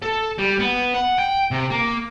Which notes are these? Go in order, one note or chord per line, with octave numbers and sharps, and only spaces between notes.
A4
G3
B3
F#5
G5
C3
A#3